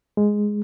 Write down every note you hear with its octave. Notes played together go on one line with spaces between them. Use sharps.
G#3